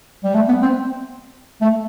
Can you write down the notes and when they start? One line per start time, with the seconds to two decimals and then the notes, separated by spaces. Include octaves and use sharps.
0.24 G3
0.35 A3
0.48 B3
0.62 C4
1.61 A3